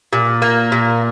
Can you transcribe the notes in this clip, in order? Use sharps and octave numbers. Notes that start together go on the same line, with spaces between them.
A#2
A#3
A#2